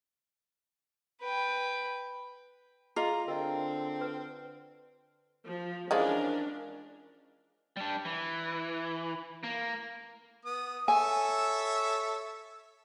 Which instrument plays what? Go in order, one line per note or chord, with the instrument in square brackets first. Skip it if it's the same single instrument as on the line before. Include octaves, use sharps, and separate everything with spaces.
[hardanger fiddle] B4 G5
[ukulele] F4 [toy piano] G#4 D#5 [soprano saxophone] A#5
[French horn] D3 [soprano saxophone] C4 [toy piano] A#4 D#5
[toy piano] B4
[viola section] F3
[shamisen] E3 F3 G#3 [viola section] C#4 D4 A#4
[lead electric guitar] G3 D4
E3
A#3
[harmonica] B3 D#6
[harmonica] A4 C#5 E5 [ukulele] G#5